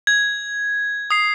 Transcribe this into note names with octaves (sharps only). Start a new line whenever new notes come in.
G#6
D#6 C7